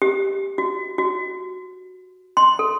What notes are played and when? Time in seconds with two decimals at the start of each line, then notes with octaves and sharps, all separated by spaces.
0.02 G4
0.58 F#4
0.98 F#4
2.37 C6
2.59 A4